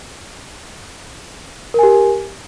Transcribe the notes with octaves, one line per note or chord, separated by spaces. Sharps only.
G4 A#4 G#5